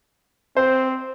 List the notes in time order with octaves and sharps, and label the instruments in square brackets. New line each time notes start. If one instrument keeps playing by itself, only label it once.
[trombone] C4 [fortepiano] C5